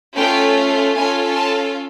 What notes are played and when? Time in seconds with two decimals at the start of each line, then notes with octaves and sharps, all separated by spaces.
0.15 A3 C#4 F4 G5
0.95 C#4 F4 A4 G#5
1.35 A5